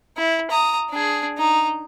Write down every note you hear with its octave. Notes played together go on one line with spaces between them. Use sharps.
E4
A#5 D#6
D4 G#4
D#4